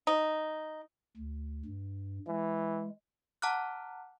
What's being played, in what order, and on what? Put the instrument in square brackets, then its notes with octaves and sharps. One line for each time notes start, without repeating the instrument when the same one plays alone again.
[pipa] D#4
[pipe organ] D2
G2
[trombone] E3 [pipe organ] G#3
[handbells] F#5 A5 A#5 D6 F6 F#6